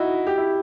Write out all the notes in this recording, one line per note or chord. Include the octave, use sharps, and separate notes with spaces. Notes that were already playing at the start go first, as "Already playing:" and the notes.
Already playing: D#4 E4 F#4
G4
E4